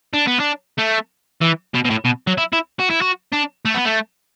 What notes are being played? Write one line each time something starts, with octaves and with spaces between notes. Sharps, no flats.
D4
B3
D4
A3
E3
B2
B2
A2
B2
F#3
E4
E4
F#4
E4
F#4
D4
A3
B3
A3